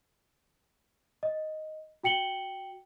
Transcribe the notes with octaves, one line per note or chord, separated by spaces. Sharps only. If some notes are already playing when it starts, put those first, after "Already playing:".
D#5
F#4 G5 C#7 F#7 G7